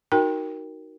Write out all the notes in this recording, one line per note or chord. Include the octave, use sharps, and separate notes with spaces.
D#4 F#4 A#4 G5